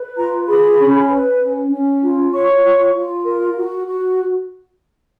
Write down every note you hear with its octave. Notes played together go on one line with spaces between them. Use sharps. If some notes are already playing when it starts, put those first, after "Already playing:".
Already playing: B4
F4 A#5
G#4 B5
C#4
B4
C#4
C#4
F4
C#5 C#6
F4
F4
A#4
F#4
F#4